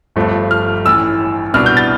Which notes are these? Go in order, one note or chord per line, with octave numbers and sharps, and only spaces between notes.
G1 G2 F3 A3
F6
A1 A2 E3 E6
C2 B2 B3 D4 F6
G6
A6